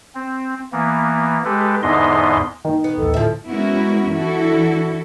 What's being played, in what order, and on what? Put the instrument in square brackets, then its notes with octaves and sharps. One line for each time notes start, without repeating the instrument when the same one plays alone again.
[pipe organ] C4
E3 A#3 B3
G#3 G4 A4 B4
E2 G#2 D3 B3 D#5 C6
[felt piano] D#3 [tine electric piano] D#5
[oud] B3
[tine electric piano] A1 D#2 [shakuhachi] A4
[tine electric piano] A2 D3 [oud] F3 E5
[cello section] G#3 B3 C#4 E4 F#4 A#4
E3 D4 E4 F#4 A4